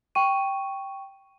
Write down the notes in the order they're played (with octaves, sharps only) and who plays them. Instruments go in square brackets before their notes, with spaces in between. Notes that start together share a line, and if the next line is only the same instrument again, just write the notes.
[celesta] G5 C#6 D#7